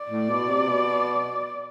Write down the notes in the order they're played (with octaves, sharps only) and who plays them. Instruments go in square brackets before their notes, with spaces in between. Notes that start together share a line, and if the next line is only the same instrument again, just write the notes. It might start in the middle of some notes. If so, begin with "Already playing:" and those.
Already playing: [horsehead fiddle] D5
[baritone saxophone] A2
B2
C3
B2